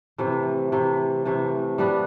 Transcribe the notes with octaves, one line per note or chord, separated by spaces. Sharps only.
C3 E3 A3
C3 E3 A3
C3 E3 A3
G3 B3 D4